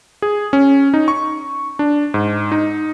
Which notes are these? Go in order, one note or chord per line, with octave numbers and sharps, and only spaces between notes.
G#4
C#4
D#4
C#6
D4
G#2
D#4